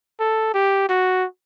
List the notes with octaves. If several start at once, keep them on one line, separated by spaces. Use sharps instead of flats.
A4
G4
F#4